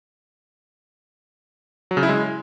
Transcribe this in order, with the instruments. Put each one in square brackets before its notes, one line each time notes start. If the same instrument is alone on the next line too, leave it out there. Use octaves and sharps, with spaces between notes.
[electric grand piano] F#3
C#3
E4
G#3